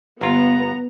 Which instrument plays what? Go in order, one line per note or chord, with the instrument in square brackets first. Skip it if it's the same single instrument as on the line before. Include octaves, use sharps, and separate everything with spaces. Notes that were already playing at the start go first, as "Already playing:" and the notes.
[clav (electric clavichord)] G1 F4 [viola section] B3 [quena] A#5